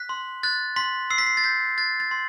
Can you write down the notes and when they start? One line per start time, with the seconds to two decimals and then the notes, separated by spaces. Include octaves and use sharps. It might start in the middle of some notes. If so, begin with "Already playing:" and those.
Already playing: F#6 B6
0.09 C6
0.43 F#6 A6
0.76 C6 B6
1.10 E6 C7
1.18 B6
1.26 C7
1.37 A6
1.44 G6 B6
1.78 F#6 A6
2.00 A6
2.11 C6